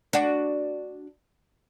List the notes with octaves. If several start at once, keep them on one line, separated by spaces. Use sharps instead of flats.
D4 F#4